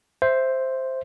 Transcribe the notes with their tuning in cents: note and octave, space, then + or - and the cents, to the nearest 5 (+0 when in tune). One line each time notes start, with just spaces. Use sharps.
C5 +0 E5 +0